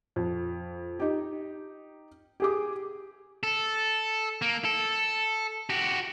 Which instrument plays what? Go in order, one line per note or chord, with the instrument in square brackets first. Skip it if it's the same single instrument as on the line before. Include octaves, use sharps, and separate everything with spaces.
[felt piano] F2
D#4 G4
G4 G#4 D6
[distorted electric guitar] A4
A#3
A4
F#4 G4